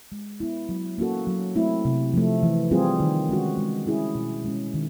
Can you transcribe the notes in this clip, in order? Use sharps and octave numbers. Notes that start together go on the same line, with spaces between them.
G#3
B3 E4
F#3
A#3 C#4 F#4 A4
F#3
A3 C4 E4
C3
F3 A3
E3
G3 C4 F4 G#4
D#3
G#3 C#4 F#4
G#3
C#4 E4 G#4
B2
G#3 C#4
D#3